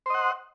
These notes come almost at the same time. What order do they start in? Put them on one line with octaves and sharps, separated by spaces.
C5 D#5 F#5